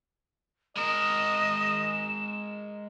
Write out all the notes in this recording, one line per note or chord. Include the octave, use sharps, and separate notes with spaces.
G#3 A#4 D#5 E7